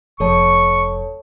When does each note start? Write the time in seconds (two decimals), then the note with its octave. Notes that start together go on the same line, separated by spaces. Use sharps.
0.20 F1 A4 C#5 A5 C#6